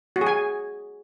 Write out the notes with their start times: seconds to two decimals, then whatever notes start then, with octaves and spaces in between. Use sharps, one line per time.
0.16 F#4
0.21 G#4
0.27 G#5